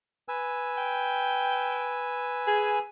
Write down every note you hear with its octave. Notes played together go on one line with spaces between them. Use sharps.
B4 G#5 E6
G5
G#4